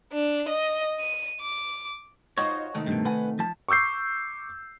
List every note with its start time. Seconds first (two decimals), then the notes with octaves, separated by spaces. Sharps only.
0.13 D4
0.49 D#5
1.00 D#7
1.41 D6
2.38 D#4 F4 F#4 C5 C#5
2.75 C3 D#3 A3
2.87 G2 B2
3.05 B4 F#5 G#5
3.39 F3 A5
3.69 C#6 D6 E6 G6 C7